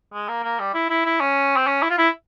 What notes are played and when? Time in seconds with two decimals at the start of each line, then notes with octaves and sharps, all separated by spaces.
0.13 G#3
0.28 A#3
0.43 A#3
0.59 G3
0.74 E4
0.90 E4
1.05 E4
1.20 C#4
1.56 C4
1.67 C#4
1.82 E4
1.90 F4
1.98 E4